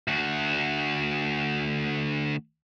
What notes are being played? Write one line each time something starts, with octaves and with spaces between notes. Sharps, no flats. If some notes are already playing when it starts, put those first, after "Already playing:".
D2 F#4